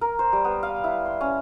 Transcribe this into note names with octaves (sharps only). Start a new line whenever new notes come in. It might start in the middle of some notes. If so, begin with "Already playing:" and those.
A#4
C5
G3
B3
F5
E4
C6
C#4